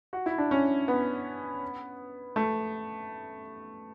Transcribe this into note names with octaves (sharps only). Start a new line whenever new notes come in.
F#4
E4
D4
C#4
B3
A3